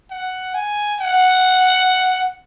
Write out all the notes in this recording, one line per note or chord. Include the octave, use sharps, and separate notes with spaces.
F#5
G#5
F#5